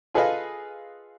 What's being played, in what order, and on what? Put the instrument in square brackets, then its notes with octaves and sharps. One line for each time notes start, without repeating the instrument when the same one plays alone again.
[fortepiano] F4 G#4 A4 B4 D#5 F5